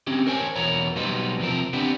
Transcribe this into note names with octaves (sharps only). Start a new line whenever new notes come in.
C4 C#4 G4
A#4 C5 C#5 G#5
E2 B2 B3 A#4 C#5
B2 F#3 G3 D#4 B4 C5
C3 F3 C4 A#4
B3 C4 D4 G4